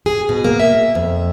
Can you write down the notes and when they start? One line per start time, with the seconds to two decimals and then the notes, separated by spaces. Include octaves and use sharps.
0.06 G#4
0.29 B2
0.45 A#3
0.60 E5
0.95 F2